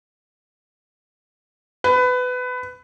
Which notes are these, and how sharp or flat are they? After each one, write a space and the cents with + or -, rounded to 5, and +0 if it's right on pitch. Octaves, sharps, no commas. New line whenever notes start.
B4 +20